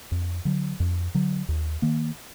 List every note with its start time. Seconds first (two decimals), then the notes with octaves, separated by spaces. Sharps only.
0.12 F2
0.45 D3 F#3
0.80 F2
1.15 D3 F#3
1.49 D#2
1.82 D#3 A#3